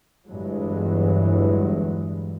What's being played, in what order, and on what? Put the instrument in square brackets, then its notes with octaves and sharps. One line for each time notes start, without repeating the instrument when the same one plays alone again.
[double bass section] G1 E2 G2 E3 F#3 G#3